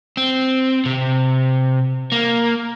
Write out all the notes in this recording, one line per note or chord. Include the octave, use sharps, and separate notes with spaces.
C4
C3
A#3